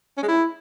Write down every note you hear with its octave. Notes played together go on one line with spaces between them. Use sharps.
C#4
G#3
E4